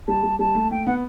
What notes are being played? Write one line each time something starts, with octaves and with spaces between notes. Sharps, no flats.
G3 A5
G3
G3 A5
A3
A3 G5
B3 F#5